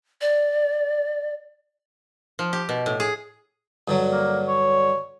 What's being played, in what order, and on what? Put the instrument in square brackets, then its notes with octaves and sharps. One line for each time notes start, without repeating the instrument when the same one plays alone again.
[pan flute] D5
[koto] F3
G4
B2
A2
G#4
[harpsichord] G2 D3 F#3
[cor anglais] A#3
C#5